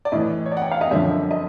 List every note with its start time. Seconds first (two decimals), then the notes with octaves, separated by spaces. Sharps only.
0.05 D5
0.12 A2 E3 D#5
0.46 C#5
0.52 D5
0.57 F#5
0.62 G5
0.72 F5
0.81 D#5
0.91 F#2 D3 F3 E5
1.31 D#5